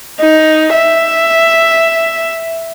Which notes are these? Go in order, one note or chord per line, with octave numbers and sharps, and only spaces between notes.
D#4
E5